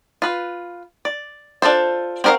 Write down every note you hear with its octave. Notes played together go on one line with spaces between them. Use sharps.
F4 B4
D5
D4 F4 A4 C5
C4 F#4 A#4 B4 F5